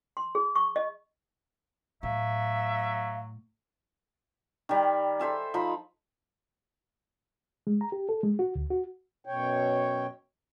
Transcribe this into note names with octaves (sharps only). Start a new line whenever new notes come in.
C6
G#4
C#6
D#5
A2 F#3 E5 F5
D#3 G3
A4 C5 E5 G#5
F3 D#4 B5
G#3
A#5
G4
A4
G#3
F#4
D2
F#4
F#2 B2 C#5 G5